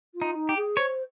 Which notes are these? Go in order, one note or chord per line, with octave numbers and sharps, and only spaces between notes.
F4
D#4
D#4
G4
G#4
C5 C#5